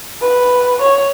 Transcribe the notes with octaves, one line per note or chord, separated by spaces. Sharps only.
B4
C#5